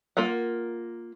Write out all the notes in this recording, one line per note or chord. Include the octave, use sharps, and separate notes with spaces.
A#3 F4 A#4 F#5